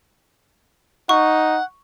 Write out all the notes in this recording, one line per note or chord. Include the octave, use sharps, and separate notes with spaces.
D#4 F#5 C#6